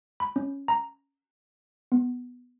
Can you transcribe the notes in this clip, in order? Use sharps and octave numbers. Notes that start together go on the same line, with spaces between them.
B5
C#4
A#5
B3